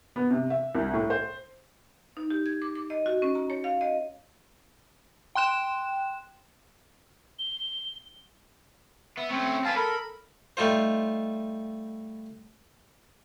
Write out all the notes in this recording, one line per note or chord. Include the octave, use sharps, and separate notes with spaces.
B3
C3
E5
C2
A2
C5
D#4
G4
G#6
D6
D6
D#5
F#4
C#4
A#5
C#5
F5
D#5
G5 C6 F#6 E7
G7
B3 E5
A3 C4 C#4
C4 B4 F5 G#5 A5
A4 A#4 B5
G3 A3 D#4 F4 C5